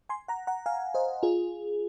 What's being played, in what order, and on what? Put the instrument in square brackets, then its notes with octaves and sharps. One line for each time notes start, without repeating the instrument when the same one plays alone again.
[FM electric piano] G#5 C6
F#5 A#5
F#5 A#5
F5 G#5
C5 D#5
F4 G#4